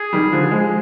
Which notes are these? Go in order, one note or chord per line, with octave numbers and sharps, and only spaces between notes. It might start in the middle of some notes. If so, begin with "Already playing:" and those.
Already playing: G#4
D#3 G3
D3 F3
F3 G#3